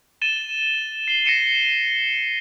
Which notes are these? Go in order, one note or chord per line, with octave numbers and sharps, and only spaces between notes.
A6 D#7 E7 G7
C7 G7
A#6 C7 C#7 D#7 E7